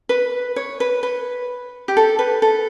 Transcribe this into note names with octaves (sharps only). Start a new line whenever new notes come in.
B4
C#5
B4
B4
G4
A4
B4
A4